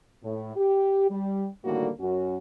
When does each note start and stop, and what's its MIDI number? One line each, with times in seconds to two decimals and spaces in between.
0.23 0.55 45
0.56 1.07 67
1.10 1.47 55
1.64 1.89 45
1.64 1.89 50
1.64 1.89 51
1.64 1.89 55
1.64 1.89 58
1.64 1.89 66
2.00 2.37 42
2.00 2.37 61
2.00 2.37 66